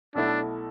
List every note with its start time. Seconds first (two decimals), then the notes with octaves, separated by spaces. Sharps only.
0.15 B1 B2 A3 D4 E4 A4